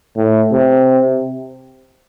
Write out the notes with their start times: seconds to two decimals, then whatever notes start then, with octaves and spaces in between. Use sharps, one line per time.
0.16 A2
0.52 C3